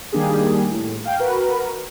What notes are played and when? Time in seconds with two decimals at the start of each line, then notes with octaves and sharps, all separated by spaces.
0.12 D#3 G3 A#3 D4 G4 G#4
0.69 A2
1.05 F5 G5
1.19 F#4 A#4 B4